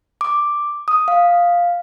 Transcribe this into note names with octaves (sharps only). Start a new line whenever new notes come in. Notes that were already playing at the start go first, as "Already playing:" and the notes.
D6
D#6
F5